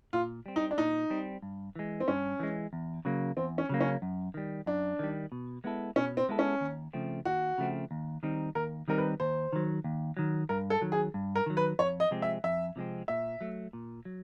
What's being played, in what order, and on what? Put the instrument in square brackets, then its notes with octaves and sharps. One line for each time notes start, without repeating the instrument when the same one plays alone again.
[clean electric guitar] A#2 [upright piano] F4
[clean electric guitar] G3 C4
[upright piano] D#4
D4
[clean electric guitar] A#2 [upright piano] D#4
[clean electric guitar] G3 C4
G2
E3 G#3
[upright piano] C4
[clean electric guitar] G2 [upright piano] C#4
[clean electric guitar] E3 G#3
E2
C#3 F#3 A#3
[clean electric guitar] E2 [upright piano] C4
[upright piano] C#4
[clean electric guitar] C#3 F#3 A#3
[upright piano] C#4
[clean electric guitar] F#2
D#3 G3
[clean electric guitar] F#2 [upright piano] D4
[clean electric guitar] D#3 G3
B2
G#3 B3 E4 A4
[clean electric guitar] B2 [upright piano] C#4
[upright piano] C4
[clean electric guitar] G#3 B3 E4 A4
[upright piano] C#4
[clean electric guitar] D#2
C#3 F3 A3 C4
[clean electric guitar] D#2 [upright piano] F#4
[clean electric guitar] C#3 F3 A3 C4
D#2
D#3 G3 C4 D#4
[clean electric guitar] D#2 [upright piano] A#4
[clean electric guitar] D#3 G3 C4 D#4 [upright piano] A#4
[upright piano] B4
[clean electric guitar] D#2 [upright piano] C5
[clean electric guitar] D#3 F#3
D#2
D#3 F#3
[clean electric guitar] G2 [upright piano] A#4
[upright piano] A4
[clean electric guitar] D#3 F#3
[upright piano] G#4
[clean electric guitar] G2
[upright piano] A#4
[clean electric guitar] D#3 F#3
[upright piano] B4
[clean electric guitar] F2 [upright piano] C#5
[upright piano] D#5
[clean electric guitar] C3 F3 G#3 C4
[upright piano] E5
[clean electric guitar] F2 [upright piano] E5
[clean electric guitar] C3 F3 G#3 C4
[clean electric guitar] A#2 [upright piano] E5
[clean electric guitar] F#3 A3
A#2
F#3